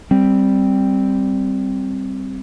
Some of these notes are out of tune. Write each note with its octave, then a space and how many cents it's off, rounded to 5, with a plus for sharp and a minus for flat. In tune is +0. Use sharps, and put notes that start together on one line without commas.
G3 +0 C4 +0